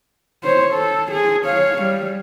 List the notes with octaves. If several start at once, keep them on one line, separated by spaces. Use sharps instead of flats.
C5 C#5
A4
G#4
C#5 F5
G3